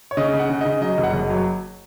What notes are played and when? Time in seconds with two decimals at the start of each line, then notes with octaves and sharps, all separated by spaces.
0.11 C#5
0.17 C#3 D#5
0.34 C#3
0.39 F#5
0.50 C#3 F#5
0.61 C#3 D#5
0.81 F#3 D#5
0.98 F#1
1.03 F#5
1.13 F#1 D#5
1.30 F#3